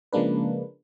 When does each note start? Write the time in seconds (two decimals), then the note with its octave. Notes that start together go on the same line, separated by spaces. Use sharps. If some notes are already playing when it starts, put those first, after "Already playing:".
0.13 C#3 F3 G#3 A#3 D4 B4